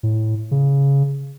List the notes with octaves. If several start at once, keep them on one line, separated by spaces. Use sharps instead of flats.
A2
C#3